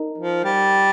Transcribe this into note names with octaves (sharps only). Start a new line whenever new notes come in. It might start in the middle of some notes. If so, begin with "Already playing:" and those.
Already playing: D#4 A#4 D#5 A#5
F3
G3